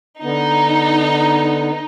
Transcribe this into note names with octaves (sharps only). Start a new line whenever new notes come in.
D3 B3 D#4